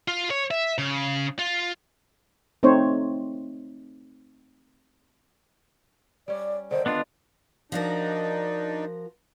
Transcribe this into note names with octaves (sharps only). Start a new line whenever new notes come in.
F4
C#5
E5
C#3
F4
A3 C4 D#4 C5 C#5
G3 C#4 D5
D3 D#3 C5
B3 D4 F4 D#5
F3 D4 D#4 F#4 A#4